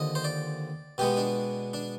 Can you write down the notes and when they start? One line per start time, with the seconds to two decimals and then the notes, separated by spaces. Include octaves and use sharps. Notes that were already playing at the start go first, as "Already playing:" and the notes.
Already playing: D#2 D3 F3 D#5
0.15 C5
0.24 D5
0.98 B2 G#3 B3 G4
1.17 D4
1.73 D4